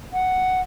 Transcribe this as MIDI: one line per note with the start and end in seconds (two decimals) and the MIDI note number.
0.13 0.61 78